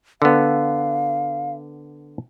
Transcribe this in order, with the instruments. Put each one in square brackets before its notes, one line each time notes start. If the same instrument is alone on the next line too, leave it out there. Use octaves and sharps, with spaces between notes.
[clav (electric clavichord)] D3 B3 [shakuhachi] F5